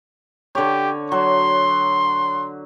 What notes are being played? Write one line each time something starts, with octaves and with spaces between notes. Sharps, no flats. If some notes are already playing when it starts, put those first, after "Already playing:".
D3 G4 C#5
F#3 C6